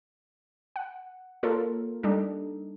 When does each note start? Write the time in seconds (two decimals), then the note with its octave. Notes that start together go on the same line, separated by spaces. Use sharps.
0.76 F#5
1.43 A#3 F4 A4 A#4 C#5
2.03 G3 D4 D#4 A4